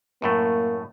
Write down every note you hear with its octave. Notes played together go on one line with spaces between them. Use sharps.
F#2 A2 A3 A#3